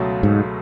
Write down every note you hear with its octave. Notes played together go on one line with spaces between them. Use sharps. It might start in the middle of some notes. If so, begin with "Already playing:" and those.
Already playing: C#2 B2 F#3 A3
G#2